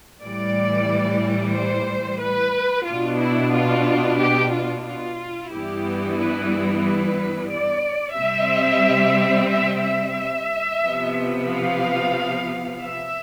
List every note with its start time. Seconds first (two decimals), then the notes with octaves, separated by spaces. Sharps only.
0.21 A2 E3 G3 D5
1.53 C5
2.21 B4
2.86 B2 B3 D4 F4
3.19 E4
3.53 F4
4.18 G4
4.51 F4
4.86 F4
5.51 G2 E3 G3 B3 E4 G4
6.18 B4
6.83 B4
7.51 D5
8.16 C3 G3 C4 E5
9.49 E5
9.82 E5
10.82 C3 F3 B3
11.47 F5
12.80 E5